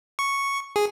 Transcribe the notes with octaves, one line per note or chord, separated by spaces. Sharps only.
C#6
G#4